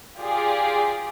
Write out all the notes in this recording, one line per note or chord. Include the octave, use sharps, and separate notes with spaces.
F4 G4 G#4 D5